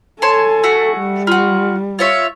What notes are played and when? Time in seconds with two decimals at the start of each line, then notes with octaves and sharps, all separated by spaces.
0.22 A4 C#5 G#5 A5 C6
0.63 A3 F#4
0.99 G3
1.27 F4 F#4
1.99 F4 C#5 E5